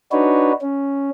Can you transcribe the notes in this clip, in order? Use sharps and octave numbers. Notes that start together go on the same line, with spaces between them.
D4 D#4 F#4 B4 C#5
C#4